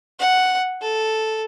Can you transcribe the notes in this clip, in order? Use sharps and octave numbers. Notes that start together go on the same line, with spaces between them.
F#5
A4